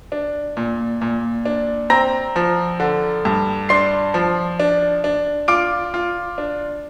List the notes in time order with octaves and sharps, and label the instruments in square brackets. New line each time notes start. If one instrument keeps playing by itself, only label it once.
[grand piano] D4
A#2
A#2
D4
C4 A#5 A#6
F3
D3
G2
D4 C6 C7
F3
D4
D4
F4 D6 D7
F4
D4